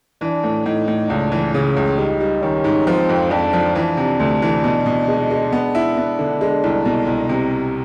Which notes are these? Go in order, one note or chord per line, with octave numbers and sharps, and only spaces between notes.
E3 D4
A2
A2 D#4
A2
C#2 D4
E3
C#3 C#4
C#2
G3 D#4
G3
D#3 C#4
G#2
F3 C4
F2
F2 D4
F3
E3 D4
C3
D2
E3
B2
B2
G#3
G#3
B3
E4
B3
D3
G#3
C2
B2
C2
C3